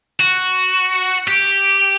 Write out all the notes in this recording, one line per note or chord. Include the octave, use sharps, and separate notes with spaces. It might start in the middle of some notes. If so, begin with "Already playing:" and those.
F#4
G4